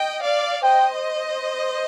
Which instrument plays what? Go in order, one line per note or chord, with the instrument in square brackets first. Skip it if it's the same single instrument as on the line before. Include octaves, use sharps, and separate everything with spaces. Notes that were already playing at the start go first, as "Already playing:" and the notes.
Already playing: [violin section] D#5 G5
D5 F5
[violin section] C5 D#5 [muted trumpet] G5